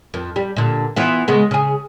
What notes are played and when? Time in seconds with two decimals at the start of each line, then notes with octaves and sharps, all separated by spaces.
0.14 F2
0.36 G3
0.56 A#2 D3
0.96 E3 B3 F4
1.28 C#3 G#3 B3
1.51 C#3 G#4